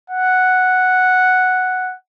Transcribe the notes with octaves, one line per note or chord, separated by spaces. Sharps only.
F#5